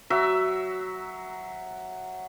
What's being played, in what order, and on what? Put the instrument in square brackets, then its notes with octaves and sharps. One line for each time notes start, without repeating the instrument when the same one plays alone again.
[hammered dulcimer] F#3 E5